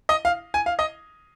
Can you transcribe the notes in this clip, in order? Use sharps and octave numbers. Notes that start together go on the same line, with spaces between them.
D#5
F5
G#5
F5
D#5